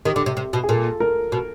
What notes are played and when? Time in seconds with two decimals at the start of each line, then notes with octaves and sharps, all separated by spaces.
0.05 D#3 G4
0.16 D3
0.26 C3
0.37 C3
0.53 B2
0.63 G#4
0.69 A#2 A4
1.00 A#4
1.32 B2